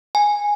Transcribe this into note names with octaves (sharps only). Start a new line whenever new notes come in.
G#5